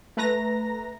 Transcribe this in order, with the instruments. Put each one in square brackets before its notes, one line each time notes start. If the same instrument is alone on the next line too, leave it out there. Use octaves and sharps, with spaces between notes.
[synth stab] A3 B4 A#5 A#6